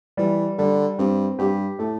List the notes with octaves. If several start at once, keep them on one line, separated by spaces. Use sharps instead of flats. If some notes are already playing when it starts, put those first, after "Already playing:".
E3 G3
D3 G3
G2 C4
G2 G4
A2 A3